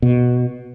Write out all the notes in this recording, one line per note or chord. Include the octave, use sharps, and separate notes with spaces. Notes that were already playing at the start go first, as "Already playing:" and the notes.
B2